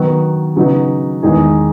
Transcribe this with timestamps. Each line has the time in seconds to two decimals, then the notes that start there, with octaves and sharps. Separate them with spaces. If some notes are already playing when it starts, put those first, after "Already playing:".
Already playing: D#3 F#3 B3
0.56 C#3 F#3 B3 D#4
1.23 E2 D#3 G#3 D#4 G#4